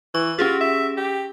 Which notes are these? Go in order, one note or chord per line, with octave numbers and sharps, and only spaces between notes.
E3 C#6
C#4 F4 G4 G#4
E5
G4